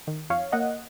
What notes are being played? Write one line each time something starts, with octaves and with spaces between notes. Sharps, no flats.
D#3
F2 C#5 F5
A#3 D#5 F#5